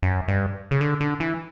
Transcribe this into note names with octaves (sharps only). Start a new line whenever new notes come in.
F#2
G2
C#3
D3
D3
E3